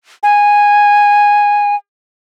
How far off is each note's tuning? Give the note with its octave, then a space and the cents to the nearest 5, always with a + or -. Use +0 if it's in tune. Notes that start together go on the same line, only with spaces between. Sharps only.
G#5 -10